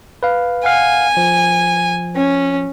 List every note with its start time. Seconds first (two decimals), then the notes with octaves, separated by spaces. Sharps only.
0.23 B4 F5
0.65 F5 F#5 G#5
1.17 F3
2.16 C#4